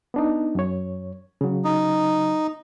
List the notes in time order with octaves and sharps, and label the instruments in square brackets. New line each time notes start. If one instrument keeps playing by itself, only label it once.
[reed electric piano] B3 D4 D#4
F#2 C#5
C#3 F#3
[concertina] D#4